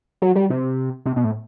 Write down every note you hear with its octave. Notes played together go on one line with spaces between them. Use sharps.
F#3
G3
C3
C3
B2
A2